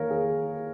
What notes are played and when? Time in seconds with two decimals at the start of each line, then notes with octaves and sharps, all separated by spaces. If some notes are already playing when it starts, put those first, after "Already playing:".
Already playing: D#3 A#3 A#4 C#5 F5
0.11 G#4